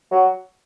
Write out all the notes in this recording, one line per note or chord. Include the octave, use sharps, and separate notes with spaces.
F#3